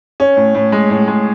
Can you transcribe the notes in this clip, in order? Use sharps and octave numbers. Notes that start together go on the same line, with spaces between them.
C#4
A2
A2
G#3
A2
G#3